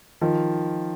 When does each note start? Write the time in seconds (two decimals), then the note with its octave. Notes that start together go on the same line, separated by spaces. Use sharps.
0.21 D#3 F3